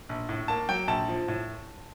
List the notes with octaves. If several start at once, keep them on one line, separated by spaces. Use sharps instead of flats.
A#1
A2
A#3 A5
F#3 G5
A#1 A5
F3
A2